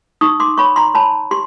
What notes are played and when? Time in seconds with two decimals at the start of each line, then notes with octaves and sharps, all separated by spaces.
0.21 D#4 C#6 D#6
0.40 C6 D6
0.58 C#5 B5 C#6
0.76 A#5 C6
0.94 C#5 A5 B5
1.31 G4 C6